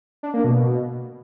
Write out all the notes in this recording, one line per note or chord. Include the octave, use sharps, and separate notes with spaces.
D4
A#3
B2